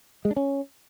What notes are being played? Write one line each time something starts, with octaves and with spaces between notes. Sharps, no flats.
G#3
D4
C#4